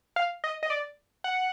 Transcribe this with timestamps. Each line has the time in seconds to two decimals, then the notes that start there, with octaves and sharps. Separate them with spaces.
0.16 F5
0.44 D#5
0.63 D#5
0.70 D5
1.24 F#5